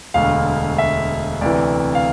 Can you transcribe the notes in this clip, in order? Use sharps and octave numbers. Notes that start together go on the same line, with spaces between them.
E1 D2 D3 F5
E5
D2 C3 E3 D5
F5